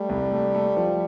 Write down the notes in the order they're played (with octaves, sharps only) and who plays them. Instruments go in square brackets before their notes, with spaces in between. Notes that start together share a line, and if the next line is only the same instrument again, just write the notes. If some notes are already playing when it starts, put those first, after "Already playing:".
Already playing: [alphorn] G3 [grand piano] A3
[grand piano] C2
A3
A3
F3